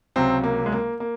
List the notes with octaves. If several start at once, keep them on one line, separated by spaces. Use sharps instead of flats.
C#2 C3 F#3 C4
A#3
G#3
A#3
A#3